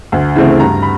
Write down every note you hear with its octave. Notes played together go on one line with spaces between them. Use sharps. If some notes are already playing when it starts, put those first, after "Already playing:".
D2
C#3 E3 A3 C4
G2 A#5
B5